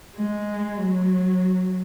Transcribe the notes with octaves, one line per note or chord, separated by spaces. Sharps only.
G#3
F#3